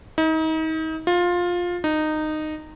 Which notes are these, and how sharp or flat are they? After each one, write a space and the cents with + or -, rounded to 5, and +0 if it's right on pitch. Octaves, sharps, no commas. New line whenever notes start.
D#4 +35
F4 +15
D#4 -15